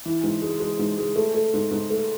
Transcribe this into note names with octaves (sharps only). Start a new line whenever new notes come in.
E3
G#2
G#3
G#3
G#2
G#3
A3
A3
G#2
G#2
A3